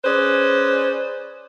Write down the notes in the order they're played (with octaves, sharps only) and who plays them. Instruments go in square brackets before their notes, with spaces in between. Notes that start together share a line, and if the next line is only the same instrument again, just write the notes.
[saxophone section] C#4 G#4 B4 C5 D5